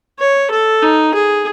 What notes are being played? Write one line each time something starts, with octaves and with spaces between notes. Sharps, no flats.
C#5
A4
D#4
G#4